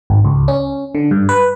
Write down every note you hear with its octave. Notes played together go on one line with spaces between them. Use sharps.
G#1
C#2
C#4
D3
G2
B4